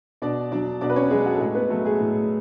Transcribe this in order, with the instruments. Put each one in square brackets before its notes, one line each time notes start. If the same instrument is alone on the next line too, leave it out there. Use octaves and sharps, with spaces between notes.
[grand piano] B2 D4 D5
F#3 D4 D5
B2 D4 D5
B4
C#4 C#5
F#3 G#3 G#4
F#4
A4
A2 G#3 G#4
B3 B4
F#3 A3 A4
G#3 G#4
A2